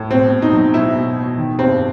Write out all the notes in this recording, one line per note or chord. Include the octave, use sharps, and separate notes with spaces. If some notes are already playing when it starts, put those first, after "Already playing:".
Already playing: A2
B2 C4
B2
D#4
F#3
B2 E4
B2
B2
D#3
G2 C4